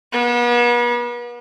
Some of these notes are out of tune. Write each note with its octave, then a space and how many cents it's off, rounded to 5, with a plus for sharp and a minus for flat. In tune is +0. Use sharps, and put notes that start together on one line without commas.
B3 -40